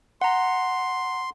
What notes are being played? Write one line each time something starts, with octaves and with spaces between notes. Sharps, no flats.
F#5 A#5 C6